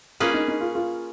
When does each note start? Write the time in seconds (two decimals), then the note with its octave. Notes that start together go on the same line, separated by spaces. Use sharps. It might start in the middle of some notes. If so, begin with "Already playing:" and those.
0.20 A#3 C#4 F4 G#4 B4
0.34 D#4
0.48 D#4
0.61 F4
0.75 F4